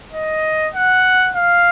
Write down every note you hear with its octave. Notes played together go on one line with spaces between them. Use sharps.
D#5
F#5
F5